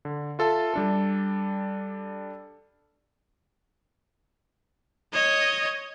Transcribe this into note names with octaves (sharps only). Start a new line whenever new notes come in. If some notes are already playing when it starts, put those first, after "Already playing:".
D3
F4 A4 E5 A5
G3 D4 A4
C#5 D#5